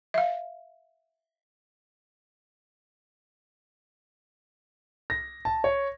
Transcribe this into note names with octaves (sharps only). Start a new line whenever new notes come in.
E5 F5
A#6
A5
C#5